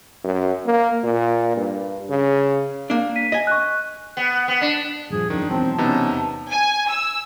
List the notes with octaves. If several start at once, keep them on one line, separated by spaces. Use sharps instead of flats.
F#2
A#3
A#2
G2
C#3
A#3 D4
B6 D#7
D#5 G#5
C#6 F#6
B3
B3
D4
D#1 G2 F3 G#4
F#2 D#3 F3 D4
E1 E2 F#3 C4 A5
C3 B3 C#4 D#4
G#5
E6